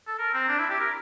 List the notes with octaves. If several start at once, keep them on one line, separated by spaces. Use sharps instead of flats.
A4
A#4
C4
D4
E4
G4
A#4